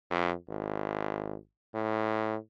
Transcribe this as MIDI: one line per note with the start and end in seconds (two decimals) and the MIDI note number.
0.11 0.34 41
0.49 1.36 32
1.75 2.36 45